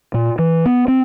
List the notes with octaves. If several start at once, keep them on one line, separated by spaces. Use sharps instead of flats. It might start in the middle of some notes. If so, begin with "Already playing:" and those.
A#2
E3
B3
C4